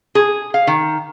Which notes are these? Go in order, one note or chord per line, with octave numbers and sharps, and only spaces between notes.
G#4
F5
D#3